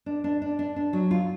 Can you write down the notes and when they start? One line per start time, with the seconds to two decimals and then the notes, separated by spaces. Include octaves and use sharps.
0.06 D4
0.24 D4
0.42 D4
0.59 D4
0.76 D4
0.93 F#3
1.11 F4